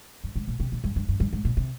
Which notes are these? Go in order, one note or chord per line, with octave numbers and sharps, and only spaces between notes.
G2
G#2
A#2
C3
A#2
G2
G2
G2
G2
G#2
A#2
C3